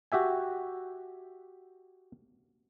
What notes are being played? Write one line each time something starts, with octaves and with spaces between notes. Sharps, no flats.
F#4 G4 E5 G#5